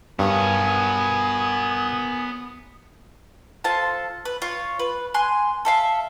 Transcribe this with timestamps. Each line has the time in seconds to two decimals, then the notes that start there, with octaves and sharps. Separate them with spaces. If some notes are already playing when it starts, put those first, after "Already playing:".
0.19 G2 B3 F#4 A#4 C#5 G#5 D#6
3.64 F4 A4 C5 A5
4.25 B4
4.42 F4 C#5
4.79 B4
5.14 G#5 C6 F#6
5.65 A4 E5 F5